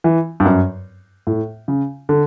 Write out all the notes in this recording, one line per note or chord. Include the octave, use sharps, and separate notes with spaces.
E3
G2
F#2
A2
C#3
D3